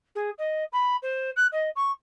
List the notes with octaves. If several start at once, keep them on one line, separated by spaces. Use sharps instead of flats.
G#4
D#5
B5
C5
F#6
D#5
C#6